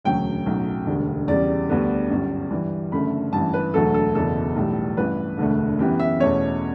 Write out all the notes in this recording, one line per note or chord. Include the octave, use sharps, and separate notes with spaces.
E1 D2 C#3 F#3 C#4 G5
B1 A2 F#3 C#4
E1 D2 D3 G3
E2 C#3 G3 D5
D2 D3 G3 B3
G1 F#2 D3 G3
G2 E3 G3
F#1 F#2 D3 A3 B5
A1 G2 E3 A5
B4
E1 D2 D3 F#3 A3 A4
A4
F#1 E2 B2 A4
B1 A2 E3 G3
A1 G2 E3 B4
E1 D2 D3 A3
F#2 E3 B3 G4
E5
E2 B2 A3 C#4 C#5